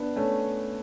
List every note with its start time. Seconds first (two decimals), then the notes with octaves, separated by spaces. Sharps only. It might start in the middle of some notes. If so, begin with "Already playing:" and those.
Already playing: B3 D4
0.16 A3 C#4